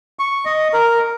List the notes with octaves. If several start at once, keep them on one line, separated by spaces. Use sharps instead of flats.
C#6
D#5
A#4